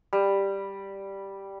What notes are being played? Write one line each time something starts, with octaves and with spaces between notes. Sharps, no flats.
G3